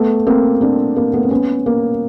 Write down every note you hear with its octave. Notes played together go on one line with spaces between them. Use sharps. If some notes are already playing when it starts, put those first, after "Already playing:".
Already playing: A3 B3
A#3 C4
C4 D4
A#3 C4
A3 B3
C4
B3 C#4
A#3